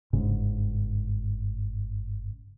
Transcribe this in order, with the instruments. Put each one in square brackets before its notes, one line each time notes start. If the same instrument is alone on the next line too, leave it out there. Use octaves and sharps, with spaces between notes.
[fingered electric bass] G1 G#2 C#3